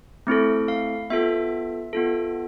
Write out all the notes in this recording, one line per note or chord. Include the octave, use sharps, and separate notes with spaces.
A3 C4 E4 A4
F5
B3 F4 A4 E5
B3 F4 A4